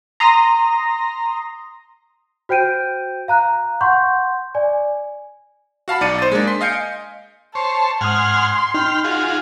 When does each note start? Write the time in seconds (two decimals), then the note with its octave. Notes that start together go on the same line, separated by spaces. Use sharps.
0.20 A#5 C6 D#6 A#6
2.49 F#4 C5 G5 G6 D7 D#7
3.28 F5 A#5 F#6
3.81 F#5 C6 C#6 G6
4.55 D5 G#5
5.88 F#4 F5 A5 B5
6.01 B1 D#4 D5 A6 C#7 D#7
6.19 C5 A6
6.32 G#3 A#3 D4
6.47 C6 B6
6.61 D#5 F5 G#5 G6 C#7 D7
7.55 C5 C#5 A5
8.01 G#2 F#5 G#5 C6 D#6 F6
8.74 D#4 G5 F6
9.04 F4 F#4 G#4